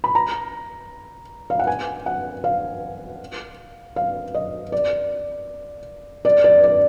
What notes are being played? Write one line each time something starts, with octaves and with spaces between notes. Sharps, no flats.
B5
A#5
F5
F#5
G#5
F#5
F5
F5
D#5
D5
D5
D5
D5